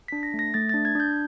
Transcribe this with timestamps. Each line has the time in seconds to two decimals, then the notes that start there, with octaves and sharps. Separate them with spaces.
0.08 D4 B6
0.23 A#6
0.34 A3
0.39 A#6
0.54 A3 A6
0.69 D4 A6
0.85 G#6
0.95 D4 G6